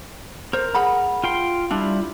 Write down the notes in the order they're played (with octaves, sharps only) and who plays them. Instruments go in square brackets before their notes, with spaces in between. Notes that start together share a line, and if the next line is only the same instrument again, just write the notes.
[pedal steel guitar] A#4 [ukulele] C5
[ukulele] G#4 F#5 B5
[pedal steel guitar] F4 G5 C6
[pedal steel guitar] G3 E4 F4 [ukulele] D4